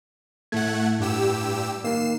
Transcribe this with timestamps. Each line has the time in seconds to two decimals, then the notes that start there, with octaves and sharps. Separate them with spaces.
0.52 A2 A3 F#5 G#6
1.00 G2 G4 E6
1.84 A#3 D#4 A#4 C7 E7